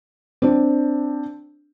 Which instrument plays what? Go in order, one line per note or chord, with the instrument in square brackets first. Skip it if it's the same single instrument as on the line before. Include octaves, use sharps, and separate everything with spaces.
[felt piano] C4 D4